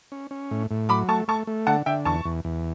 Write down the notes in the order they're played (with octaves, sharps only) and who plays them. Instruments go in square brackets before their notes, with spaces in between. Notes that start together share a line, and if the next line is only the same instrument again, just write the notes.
[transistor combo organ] C#4
C#4
A2
A2
[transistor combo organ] F#3 [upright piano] B5 D6
[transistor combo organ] A3 [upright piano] A5 C#6
[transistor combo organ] A3 [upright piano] A5 C#6
[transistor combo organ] A3
[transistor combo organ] D3 [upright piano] F#5 A5
[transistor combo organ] D3 [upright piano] E5 G5
[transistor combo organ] E2 [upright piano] A5 C#6
[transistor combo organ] E2
E2